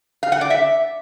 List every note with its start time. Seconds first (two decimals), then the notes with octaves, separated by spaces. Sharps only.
0.23 F5
0.32 F#5
0.41 D5
0.50 E5